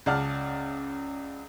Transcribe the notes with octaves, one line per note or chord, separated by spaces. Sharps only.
C#2 C#3 D5 F#5 A5 F6